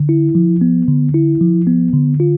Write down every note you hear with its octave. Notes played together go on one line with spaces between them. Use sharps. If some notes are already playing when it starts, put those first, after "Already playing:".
Already playing: D3
E4
F3
B3
D3
E4
F3
B3
D3
F4